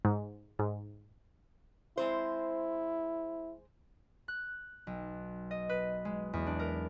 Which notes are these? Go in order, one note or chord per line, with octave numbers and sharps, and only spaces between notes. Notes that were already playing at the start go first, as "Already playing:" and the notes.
G#2
G#2
G#3 C4 E4 C5
F#6
B1
D#5
B4
G#3
E2
D4
A#4